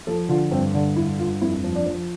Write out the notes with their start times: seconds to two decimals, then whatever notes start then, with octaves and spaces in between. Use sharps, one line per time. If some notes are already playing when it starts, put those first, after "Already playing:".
0.07 F3 A4
0.29 D3 F4
0.51 G2 C4
0.74 D3 D4
0.96 G2 E4
1.19 G2 F4
1.41 F2 E4
1.64 F3
1.76 D4
1.86 F3